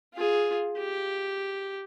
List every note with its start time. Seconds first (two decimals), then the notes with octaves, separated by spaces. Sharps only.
0.14 F4 G#4
0.78 G4